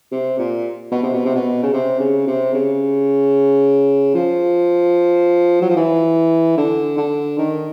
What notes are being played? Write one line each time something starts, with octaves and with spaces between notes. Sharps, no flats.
C3
A#2
B2
C3
B2
C3
B2
C#3
C3
C#3
C3
C#3
F3
F#3
F3
E3
D3
D3
D#3